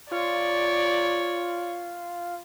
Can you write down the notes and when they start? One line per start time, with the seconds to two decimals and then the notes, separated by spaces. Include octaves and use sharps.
0.11 F4 C#5 D5